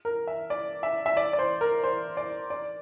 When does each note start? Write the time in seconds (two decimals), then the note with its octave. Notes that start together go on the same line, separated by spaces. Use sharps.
0.05 A#4
0.27 E5
0.50 D5
0.83 E5
1.06 E5
1.17 D5
1.33 D5
1.39 C5
1.61 A#4
1.84 C5
2.17 D5
2.50 D5